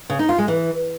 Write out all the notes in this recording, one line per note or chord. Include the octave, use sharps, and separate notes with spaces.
C#3
D#4
F4
G#3
E3